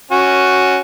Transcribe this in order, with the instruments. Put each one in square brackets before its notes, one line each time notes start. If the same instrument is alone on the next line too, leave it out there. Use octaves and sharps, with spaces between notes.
[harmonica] C#4 F#4